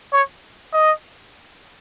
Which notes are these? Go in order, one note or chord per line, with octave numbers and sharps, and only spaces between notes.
C#5
D#5